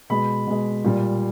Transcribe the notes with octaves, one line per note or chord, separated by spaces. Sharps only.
B2 G#3 B5
B2 G#3
A#2 G3